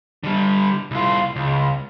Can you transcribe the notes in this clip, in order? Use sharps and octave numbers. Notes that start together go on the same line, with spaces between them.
D3 G3
C2 F4
C#2